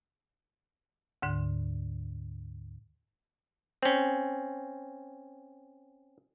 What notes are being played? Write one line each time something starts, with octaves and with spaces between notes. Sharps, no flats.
D2 G#2 D3
C4 C#4